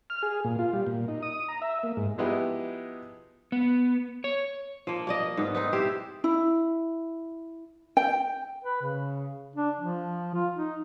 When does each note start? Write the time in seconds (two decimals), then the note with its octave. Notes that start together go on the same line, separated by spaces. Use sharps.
0.10 F6
0.23 G#4
0.44 A#2
0.59 F4
0.73 G3
0.87 A#2
1.08 D#4
1.22 D#6
1.49 A#5
1.62 E5
1.83 A#3
1.97 G#2
2.18 F3 G#3 B3 D#4 E4 G4
3.52 B3
4.24 C#5
4.87 F3 A#3
5.07 A#3 D5 D#5
5.37 G#2 B3
5.55 B3 C4 D#4
5.73 E4 G4 C5
6.24 E4
7.97 G5
8.64 B4
8.82 C#3
9.56 D4
9.79 F3
10.34 F4
10.56 D#4